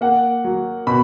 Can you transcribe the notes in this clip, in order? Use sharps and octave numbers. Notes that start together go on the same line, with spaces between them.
A#3 F#5
F#3
B2 B5